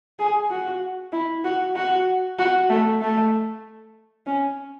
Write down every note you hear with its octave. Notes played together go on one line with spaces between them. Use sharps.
G#4
F#4
E4
F#4
F#4
F#4
A3
A3
C#4